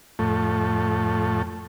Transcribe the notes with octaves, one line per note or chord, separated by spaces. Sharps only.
F2 A2 A3